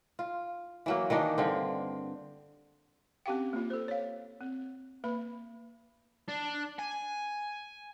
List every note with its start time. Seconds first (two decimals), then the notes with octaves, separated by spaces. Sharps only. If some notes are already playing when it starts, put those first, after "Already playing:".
0.19 F4
0.86 E3 F#3 A#3
1.10 D#3 E3 D4 D#4
1.38 G2 D3 C4
3.26 C4 C#4 G4 F5 G5
3.53 A#3 F4
3.70 A4 C5
3.88 C#5 F5
4.41 C4
5.04 A#3 B4 B5
6.29 D4
6.79 G#5